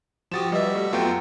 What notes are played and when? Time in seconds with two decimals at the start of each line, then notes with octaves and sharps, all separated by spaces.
0.31 F3 F#4 G4 D#6 A6 E7
0.52 G3 F#4 B4 D#5 E5
0.75 A3 G4
0.93 F#2 A3 B3 F4 F#4 G5